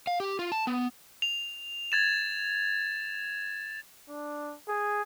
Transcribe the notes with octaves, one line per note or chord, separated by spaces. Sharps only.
F5
G4
F4
A5
B3
F7
G#6 A6 E7
D4
G#4